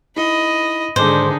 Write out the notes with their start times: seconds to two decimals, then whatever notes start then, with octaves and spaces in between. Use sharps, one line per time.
0.17 D#4 E4 D#5 B5
0.96 G#2 D3 D#3 G#3 D4 D#4 C5 D6